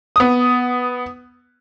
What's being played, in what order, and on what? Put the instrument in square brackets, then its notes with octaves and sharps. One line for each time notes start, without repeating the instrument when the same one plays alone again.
[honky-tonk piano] B3 D#6